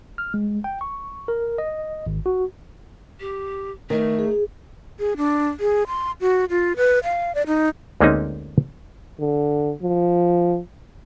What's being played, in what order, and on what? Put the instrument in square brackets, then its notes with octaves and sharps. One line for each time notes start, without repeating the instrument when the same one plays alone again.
[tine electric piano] F6
G#3
G5
C#6
A#4
D#5
G#1
F#4
[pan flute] G4
[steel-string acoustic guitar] D#3 [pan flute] A3
[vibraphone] G#4
[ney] G#4
D4
G#4
C6
F#4
F4
B4
F5
D5
D#4
[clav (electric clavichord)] D2 G#3 A#3 C4 C#4 D#4
[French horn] D3
F3